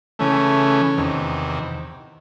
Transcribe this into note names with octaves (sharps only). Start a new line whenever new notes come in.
C#3 E3 A3 C#4
E2 C3 D#3